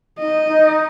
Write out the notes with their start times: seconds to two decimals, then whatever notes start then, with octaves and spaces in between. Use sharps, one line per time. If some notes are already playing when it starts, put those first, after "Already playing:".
0.19 D#4 D#5
0.48 D#4